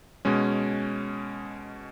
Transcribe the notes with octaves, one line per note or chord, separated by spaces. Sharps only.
B2 G#3 C#4